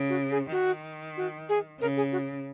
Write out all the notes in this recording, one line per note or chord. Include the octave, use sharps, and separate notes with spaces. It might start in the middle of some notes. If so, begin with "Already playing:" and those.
Already playing: C#3
F#4
G#4
D#3 F#4
F#4
G#4
C#3 A#4
G#4
F#4